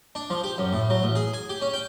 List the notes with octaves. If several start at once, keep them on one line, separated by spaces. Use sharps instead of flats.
D4
F3
G4
F#2
A2
F#3
A1
G#4
G#5
G4
C#4
G5